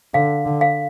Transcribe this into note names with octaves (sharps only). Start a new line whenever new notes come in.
D3 F5
D3
F5